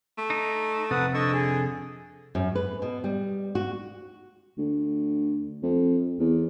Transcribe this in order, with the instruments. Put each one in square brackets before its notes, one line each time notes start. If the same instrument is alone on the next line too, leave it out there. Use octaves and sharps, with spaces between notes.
[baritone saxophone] A3
[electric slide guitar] D#4
[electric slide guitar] F2 C3 A4 [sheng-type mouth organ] B4 F#5 D#6
[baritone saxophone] D3 [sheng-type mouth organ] D#5 C#6 E6
[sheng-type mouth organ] G#4
[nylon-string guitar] F#2
B4
B2
G3
F#4
[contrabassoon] D2
F2
E2